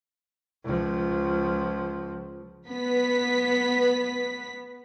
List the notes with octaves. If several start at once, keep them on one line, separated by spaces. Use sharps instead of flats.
C#2 F3
B3 B4 B6